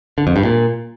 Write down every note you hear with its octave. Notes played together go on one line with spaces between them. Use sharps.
D3
F2
G2
A#2